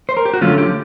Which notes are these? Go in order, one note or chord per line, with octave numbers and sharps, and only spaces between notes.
C5
A#4
G4
F#4
D3 F#3 A3 C#4 F4
G4